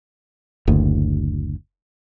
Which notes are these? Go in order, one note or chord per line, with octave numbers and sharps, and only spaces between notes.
F#1 D2